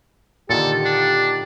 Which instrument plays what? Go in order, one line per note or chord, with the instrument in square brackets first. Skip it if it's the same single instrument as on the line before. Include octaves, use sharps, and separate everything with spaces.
[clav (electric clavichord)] A#2 D3 D#3 [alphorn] G4 [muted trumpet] A4
[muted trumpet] D4